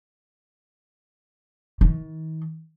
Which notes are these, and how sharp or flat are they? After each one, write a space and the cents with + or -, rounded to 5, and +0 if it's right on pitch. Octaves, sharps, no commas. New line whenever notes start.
D#3 +40